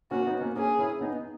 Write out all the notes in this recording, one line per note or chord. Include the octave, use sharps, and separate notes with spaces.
A#3 C#4 F#4
B3 D#4
A#3 C#4
A#3 C#4 G#4
C#4 E4
B3 D#4